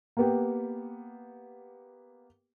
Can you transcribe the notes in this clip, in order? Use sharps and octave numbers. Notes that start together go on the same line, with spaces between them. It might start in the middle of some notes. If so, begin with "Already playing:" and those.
A#3 B3 G4